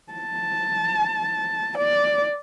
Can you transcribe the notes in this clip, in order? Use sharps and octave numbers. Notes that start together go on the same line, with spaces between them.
A5
D5